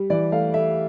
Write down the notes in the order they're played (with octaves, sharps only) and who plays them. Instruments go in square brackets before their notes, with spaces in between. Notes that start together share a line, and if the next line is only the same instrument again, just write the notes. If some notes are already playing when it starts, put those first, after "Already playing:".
Already playing: [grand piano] G3
E3 D5
A3 F5
A3 E5